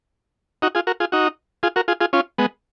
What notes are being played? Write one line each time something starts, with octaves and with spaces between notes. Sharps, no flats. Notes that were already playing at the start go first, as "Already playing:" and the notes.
D#4 F#4
F4 G#4
F#4 A#4
F4 G#4
D#4 F#4
F4 G#4
F#4 A#4
F4 G#4
F4 G#4
C#4 F4
G#3 B3